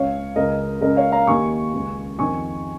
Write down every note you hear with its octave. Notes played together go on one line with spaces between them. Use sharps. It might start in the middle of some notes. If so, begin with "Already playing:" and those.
Already playing: C#2 C#3 C#5 F5
C#2 C#3 A#4 D#5
C#2 C#3 A#4 D#5
C#5 F5
F5 A#5
D#2 D#3 G#5 C#6
C#2 C#3
F2 D#3 G#5 C#6